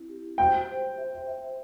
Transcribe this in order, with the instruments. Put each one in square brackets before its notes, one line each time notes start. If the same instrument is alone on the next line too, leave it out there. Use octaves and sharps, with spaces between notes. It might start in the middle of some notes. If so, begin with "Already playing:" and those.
Already playing: [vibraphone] C4 E4
G4
[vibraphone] C5 [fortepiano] G5
[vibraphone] C5
E5
E5